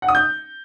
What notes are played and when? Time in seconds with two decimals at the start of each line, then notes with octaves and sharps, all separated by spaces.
0.02 F#5
0.08 D#6
0.15 G6